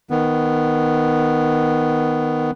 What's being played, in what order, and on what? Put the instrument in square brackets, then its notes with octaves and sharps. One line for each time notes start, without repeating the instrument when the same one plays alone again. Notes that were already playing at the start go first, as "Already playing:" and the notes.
[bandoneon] D#3 B3